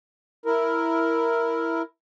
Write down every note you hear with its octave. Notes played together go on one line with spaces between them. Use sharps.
E4 A#4